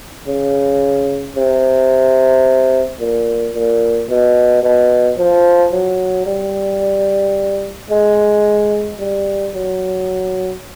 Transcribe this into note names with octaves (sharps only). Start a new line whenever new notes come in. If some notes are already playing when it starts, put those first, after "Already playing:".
C#3
C3
A#2
A#2
B2
B2
F3
F#3
G3
G#3
G3
F#3